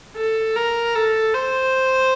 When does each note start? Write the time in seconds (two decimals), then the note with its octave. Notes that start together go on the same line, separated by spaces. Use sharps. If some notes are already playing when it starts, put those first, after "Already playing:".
0.16 A4
0.56 A#4
0.95 A4
1.34 C5